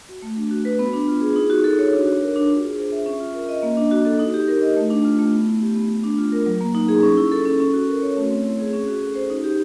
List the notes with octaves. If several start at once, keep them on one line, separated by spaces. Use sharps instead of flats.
F#4
A3
D4
F#4
B4
B3
D4
F4
G#4
D#4
F#4
A4
C#5
D4
F#4
A#4
D4
F4
G#4
C5
E5
C#4
F4
A#4
D#5
A#3
D4
F#4
A4
D#4
G4
A#4
D#5
A3
D4
F4
A3
B3
E4
G4
B3
A3
D4
F4
A#4
F#3
A#3
D#4
G#4
C#4
E4
A4
C#4
C#4
F#4
A#4
C#5
A3
C4
E4
G#4
C#4
F#4
A4
C5
D#4
G4